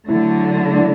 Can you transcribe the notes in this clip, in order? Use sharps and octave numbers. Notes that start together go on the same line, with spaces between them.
D3 F#3 A3 E4
D4
E4